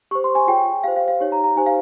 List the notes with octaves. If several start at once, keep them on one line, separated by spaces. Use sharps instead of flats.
G4 C5 C#6
C6
G#5
F4 G#4 C#5 G5
G4 C5 F5
F5
F5
D#4 G4 C#5
A#5
A#5
D#4 G4 C5 G#5
F5